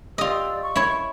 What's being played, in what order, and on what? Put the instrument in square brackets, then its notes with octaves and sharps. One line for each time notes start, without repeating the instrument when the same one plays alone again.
[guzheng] F4 D#5 [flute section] G4 D5 E6
[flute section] C#6
[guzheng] E4 C#5